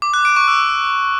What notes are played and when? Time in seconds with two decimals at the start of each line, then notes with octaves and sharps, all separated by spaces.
0.02 D6
0.14 F#6
0.25 D7
0.36 C#6
0.48 E6